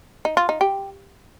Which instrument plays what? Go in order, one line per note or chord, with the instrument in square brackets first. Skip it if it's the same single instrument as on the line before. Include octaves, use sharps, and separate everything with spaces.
[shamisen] D#4
F4
D#4
G4